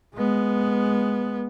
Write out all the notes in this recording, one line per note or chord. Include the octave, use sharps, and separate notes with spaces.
G#3 B3